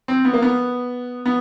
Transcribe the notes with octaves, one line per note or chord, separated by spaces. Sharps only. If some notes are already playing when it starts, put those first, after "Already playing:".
C4
B3
A#3
B3
B3